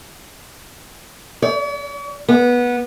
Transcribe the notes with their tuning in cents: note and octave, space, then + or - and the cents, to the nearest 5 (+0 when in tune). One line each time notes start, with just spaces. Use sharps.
C#5 +45
B3 -20